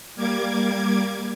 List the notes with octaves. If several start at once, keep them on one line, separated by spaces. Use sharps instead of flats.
G3 A#3 D6 G#6